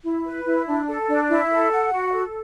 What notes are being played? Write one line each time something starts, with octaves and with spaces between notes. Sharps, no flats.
E4
B4
E4
D4
A4
D4
E4
A4
F#5
F#4
A4